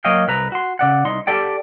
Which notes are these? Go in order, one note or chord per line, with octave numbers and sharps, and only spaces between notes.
F#3 A#3 C#5 D#5 F5 G5
C2 B4 A#5
F#4 C6
C#3 D5 F#5
C2 D#4 C6
G4 A4 D5 G5